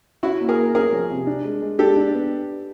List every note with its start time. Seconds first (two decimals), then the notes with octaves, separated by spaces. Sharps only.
0.23 C#4 E4 F#4
0.41 A#3
0.49 G#4 A#4
0.58 A#3
0.75 C#4 G#4 A#4
0.92 F3
1.10 C3
1.27 D4
1.44 G#3
1.62 G#3
1.79 D4 G4 A4
1.96 D4
2.14 B3